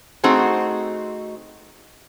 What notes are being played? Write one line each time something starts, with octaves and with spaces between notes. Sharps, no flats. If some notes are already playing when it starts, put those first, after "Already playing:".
A3 C4 D#4 F#4 G#4